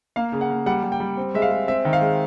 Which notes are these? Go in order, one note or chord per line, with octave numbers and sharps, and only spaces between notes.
A#3 F5
C#3
F#5
A#3
G3 F#5
G3
G5
G3
C4
G#3 E5
F5
G#3
C4 E5
D#3
F5
G#3